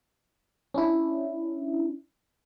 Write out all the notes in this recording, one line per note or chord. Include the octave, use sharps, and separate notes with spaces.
C#4 D4 E4